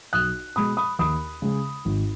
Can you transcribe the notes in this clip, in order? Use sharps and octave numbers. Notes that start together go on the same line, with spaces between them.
B1 D#6 F#6
B2 G#3 B5 D#6
B5 D#6
D#2 B5 D#6
C#3 G#3
G#1